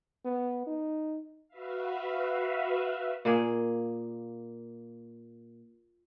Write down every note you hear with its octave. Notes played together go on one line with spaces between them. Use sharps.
B3
D#4
F#4 B4 E5 F5
A#2 A#3 G#4